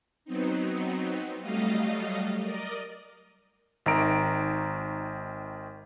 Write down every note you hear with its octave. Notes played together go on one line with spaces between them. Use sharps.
F#3 B3 C4 D#4
F#3 G3 A3 D#5 F5
A#4 D5 D#5
G#1 D#3 A#5 D7